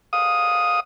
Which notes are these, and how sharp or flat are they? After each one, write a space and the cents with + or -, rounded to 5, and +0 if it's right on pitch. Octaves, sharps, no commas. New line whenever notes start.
F5 +20 D#6 +0